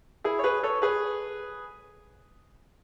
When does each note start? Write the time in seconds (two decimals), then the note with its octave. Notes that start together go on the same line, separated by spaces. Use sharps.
0.24 E4 G#4
0.39 C#5
0.44 G#4 B4
0.63 A4 C#5
0.82 G#4 B4